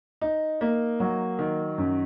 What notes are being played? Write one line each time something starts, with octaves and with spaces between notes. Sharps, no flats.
D#4
A#3
F#3
D#3
F#2